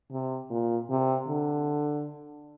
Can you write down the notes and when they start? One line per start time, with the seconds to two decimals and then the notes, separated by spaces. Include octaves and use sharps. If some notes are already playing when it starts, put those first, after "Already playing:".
0.12 C3
0.50 A#2
0.90 C3
1.28 D3